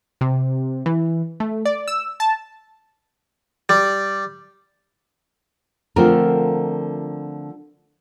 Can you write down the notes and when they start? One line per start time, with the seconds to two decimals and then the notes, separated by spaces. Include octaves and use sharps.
0.21 C3
0.86 E3
1.40 A3
1.65 D5
1.88 E6
2.20 A5
3.69 G3
5.96 D3 F3 A3 C4 F4 A#4